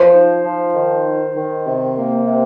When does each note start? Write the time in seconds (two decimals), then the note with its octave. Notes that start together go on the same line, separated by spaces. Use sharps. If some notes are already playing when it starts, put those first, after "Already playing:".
Already playing: F3 C5
0.13 D#4
0.44 F3
0.74 D#3
1.05 D#4
1.36 D#3
1.66 C3
1.97 A#3
2.27 C3